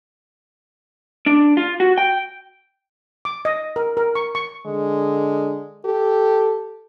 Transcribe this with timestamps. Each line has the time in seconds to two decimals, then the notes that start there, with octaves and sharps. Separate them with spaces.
1.26 D4
1.57 F4
1.80 F#4
1.98 G5
3.25 D6
3.45 D#5
3.76 A#4
3.97 A#4
4.15 C#6
4.35 C#6
4.66 D3 G#3
5.85 G4 A4